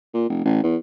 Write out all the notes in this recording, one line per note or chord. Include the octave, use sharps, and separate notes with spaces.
A#2
F1
A1
E2